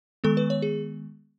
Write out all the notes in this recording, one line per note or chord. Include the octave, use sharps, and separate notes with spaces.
D#3 G#3 B3 A4
B4
C#5
G#4